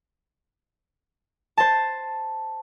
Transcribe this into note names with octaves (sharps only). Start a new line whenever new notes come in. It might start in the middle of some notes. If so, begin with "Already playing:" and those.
C5 A5